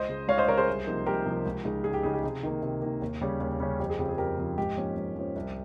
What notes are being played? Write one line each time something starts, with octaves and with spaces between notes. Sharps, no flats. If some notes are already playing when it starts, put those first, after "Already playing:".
Already playing: C#2 C5 D#5
C#3 G#3
C#2 C#5 F5
C5 D#5
C#3 G#3 A#4 C#5
G#4 C5
C2
C3 F3 A#3 D#4
C2 G4 A#4
C3 F3 A#3 D#4
C#2
C#3 G#3 D#4
C#2 G#4
G4
C#3 G#3 D#4 G#4
G4
C3 G#4
D#3 A#3
C3
D#3 A#3
D#2
C#3 G3 C#4
D#2
C#3 G3 C#4
F2 G4
G#4
C#3 F3 C4 G4
G#4
F2 G4 A#4
C#3 F3 C4
G#2 G4
F3 A#3 C#4
G#2
F3 A#3 C#4
C2